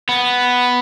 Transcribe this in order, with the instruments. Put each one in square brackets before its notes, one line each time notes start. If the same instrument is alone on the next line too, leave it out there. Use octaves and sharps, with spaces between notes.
[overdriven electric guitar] B3